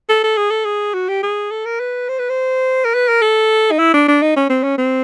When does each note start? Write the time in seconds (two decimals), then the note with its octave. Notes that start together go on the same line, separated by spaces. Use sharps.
0.09 A4
0.23 A4
0.37 G#4
0.51 A4
0.65 G#4
0.94 F#4
1.09 G4
1.23 G#4
1.51 A4
1.65 A#4
1.80 B4
2.09 C5
2.19 B4
2.29 C5
2.85 A#4
2.94 B4
3.08 A#4
3.21 A4
3.71 D#4
3.78 E4
3.94 D4
4.08 D4
4.22 D#4
4.36 C#4
4.50 C4
4.63 C#4
4.78 C4